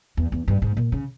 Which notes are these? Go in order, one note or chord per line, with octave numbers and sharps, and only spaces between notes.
E2
E2
G2
G#2
A#2
C#3